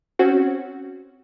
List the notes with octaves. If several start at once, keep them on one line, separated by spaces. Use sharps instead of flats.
C4 C#4 F#4